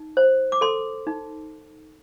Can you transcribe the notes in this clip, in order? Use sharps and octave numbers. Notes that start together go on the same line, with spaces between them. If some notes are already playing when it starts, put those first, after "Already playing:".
Already playing: D#4
C5
D6
A4 C6
D#4